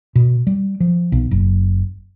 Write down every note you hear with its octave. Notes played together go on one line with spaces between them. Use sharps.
B2
G3
F3
B1
F#1